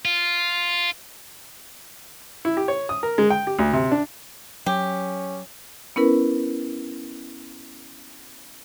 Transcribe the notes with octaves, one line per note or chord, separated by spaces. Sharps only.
F4
E4
G4
C#5
D#6
A#4
G#3
G5
G4
D2
C3
D4
F#3 C#4 G4
B3 C#4 E4 A#4 B4